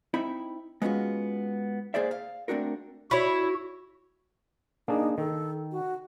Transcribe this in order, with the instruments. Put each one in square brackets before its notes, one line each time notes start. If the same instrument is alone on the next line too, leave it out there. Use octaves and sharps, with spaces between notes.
[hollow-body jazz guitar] C4 D#4 E4 E5 B5
G#3 B3 C#4 F4 F#4
A#3 G#4 C5 D5 E5
F5
A3 C4 D4 F#4 A#4
[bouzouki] E4 C#5 [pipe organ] F#4
[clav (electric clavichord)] A#3 D4 G#4 [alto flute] D#4
[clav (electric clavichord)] D#3 [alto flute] A4
[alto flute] F#4